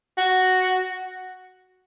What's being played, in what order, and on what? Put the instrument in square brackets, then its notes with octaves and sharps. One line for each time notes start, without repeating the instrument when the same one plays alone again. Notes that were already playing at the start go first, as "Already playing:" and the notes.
[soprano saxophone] F#4